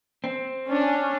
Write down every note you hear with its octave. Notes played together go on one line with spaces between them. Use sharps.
C4
C#4 D4